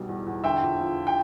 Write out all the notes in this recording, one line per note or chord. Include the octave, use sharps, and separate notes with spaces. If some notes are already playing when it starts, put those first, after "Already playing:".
Already playing: B1 B2 G3
E2
E2
D3 E5 G5
F2
F3
G5